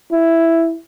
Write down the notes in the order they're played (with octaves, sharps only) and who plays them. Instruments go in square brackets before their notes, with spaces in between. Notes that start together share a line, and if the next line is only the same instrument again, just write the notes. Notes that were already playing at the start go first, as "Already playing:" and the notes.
[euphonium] E4